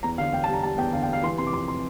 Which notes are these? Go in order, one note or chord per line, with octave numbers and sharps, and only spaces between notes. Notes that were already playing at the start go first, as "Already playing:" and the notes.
E2 A#5
D3 F5
E2 G5
A5
G3 A#5
G3 A5
E2 G5
D3 F5
G5
G3 F5
E3 C6
C3 C6
D6
F2 C6
C6